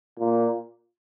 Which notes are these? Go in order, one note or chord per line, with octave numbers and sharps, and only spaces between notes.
A#2